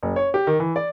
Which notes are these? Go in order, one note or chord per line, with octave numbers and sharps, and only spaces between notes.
F#1
C#5
G4
D#3
E3
D5